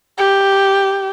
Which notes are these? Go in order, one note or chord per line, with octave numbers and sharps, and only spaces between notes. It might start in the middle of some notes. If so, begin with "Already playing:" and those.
G4